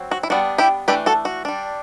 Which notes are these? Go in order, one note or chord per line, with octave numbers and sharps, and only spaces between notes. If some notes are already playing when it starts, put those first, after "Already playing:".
Already playing: F#3 C4
F#4
E4
G3 B3 D4 F#4
E4 G4
E3 A3 D4 G4 B4
F#4 A4
F#4
G3 D4